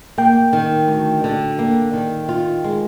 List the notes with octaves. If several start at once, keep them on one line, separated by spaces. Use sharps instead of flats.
A#3 G5
D#3
D2
D3
A#3
D#3
F4
G#3